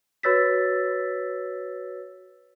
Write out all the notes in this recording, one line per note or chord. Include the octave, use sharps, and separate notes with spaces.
F#4 B4 C#5 E6 A6 B6